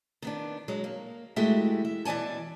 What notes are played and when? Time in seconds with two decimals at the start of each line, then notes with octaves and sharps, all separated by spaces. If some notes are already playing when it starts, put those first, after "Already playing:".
0.22 D#3 B3 D4
0.68 F#3 G#3
0.84 A#3
1.36 E3 G#3 A3 F#4 G4 E5
1.85 E5
2.05 B2 E3 D5 G#5 A5